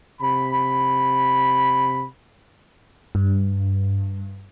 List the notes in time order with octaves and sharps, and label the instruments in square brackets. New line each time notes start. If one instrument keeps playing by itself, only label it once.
[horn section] C3 B5
[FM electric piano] G2